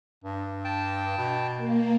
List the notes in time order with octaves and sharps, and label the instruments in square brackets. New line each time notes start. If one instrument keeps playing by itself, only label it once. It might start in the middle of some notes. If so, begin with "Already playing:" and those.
[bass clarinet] G2
[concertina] G5 A5
[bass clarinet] B2
[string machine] A#3